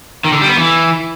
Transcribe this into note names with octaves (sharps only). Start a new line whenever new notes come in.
D#3
D3
G3
B3
E3